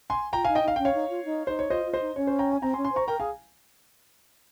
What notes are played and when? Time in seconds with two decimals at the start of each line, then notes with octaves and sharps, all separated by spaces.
0.10 G#5 C6
0.33 F4 G5 A#5
0.44 F5 G#5
0.48 D#4
0.55 D#5 G5
0.63 D#4 F5
0.76 C#4 G5
0.85 C#5 F5
0.94 D#4
1.10 F4
1.25 D#4
1.47 D#4 C5
1.59 C#5
1.70 F4 C5 D#5
1.86 F4
1.93 C5 D#5
2.01 D#4
2.16 C#4 C#5
2.27 C5
2.39 G5 A#5
2.52 G#5
2.62 C4 G5 A#5
2.73 G#5 C6
2.77 C#4
2.85 G#5 C6
2.92 C5 A#5 C#6
3.08 A#4 G5 A#5
3.19 G#4 F5 G#5